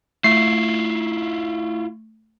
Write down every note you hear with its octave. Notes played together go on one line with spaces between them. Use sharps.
A3 E4 F4 C7